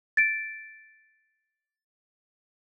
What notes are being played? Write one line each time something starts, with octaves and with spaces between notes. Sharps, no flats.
A6 D7